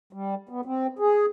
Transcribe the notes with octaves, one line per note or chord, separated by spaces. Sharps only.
G3
B3
C4
G#4